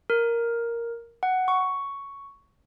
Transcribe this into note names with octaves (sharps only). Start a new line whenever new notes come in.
A#4
F#5
C#6